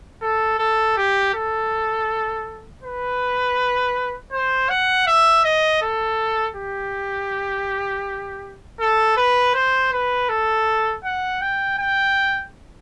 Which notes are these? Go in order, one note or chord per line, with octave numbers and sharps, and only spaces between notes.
A4
A4
G4
A4
B4
C5
F#5
E5
D#5
A4
G4
A4
B4
C5
B4
A4
F#5
G5
G5